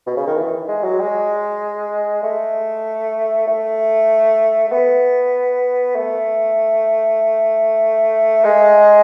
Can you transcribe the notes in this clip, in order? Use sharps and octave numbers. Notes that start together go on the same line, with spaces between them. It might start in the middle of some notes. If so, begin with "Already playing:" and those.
B2
C#3
D#3
E3
G#3
F#3
G#3
A3
A3
A3
B3
A3
G#3